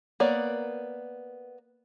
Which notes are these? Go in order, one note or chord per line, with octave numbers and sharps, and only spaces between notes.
A#3 B3 C#5 D5